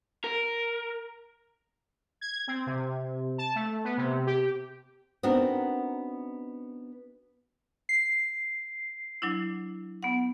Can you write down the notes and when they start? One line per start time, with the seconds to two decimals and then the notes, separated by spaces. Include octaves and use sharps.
0.24 A#4
2.21 G#6
2.47 C4
2.67 C3
3.38 A5
3.55 A3
3.84 B3
3.97 C3
4.27 G4
5.23 B3 C4 D4 D#4 F#4 A#4
7.89 C7
9.22 F#3 D4 E4
10.03 B3 F#5